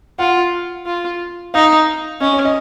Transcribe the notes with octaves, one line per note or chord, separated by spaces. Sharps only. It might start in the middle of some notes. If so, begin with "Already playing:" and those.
F4 F#5
F4
D#4 F5
C#4 D#5
C#5
D#5